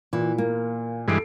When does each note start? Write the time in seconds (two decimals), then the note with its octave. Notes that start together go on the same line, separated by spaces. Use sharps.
0.13 A#2 E3
0.38 A#3
1.08 G2 E3 G#3 A4 C7 D7